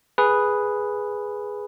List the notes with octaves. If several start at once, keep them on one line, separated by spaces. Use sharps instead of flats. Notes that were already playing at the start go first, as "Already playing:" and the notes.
G#4 B4